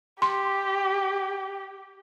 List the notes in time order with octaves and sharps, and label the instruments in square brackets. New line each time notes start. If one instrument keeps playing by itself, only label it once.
[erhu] G4 [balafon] C6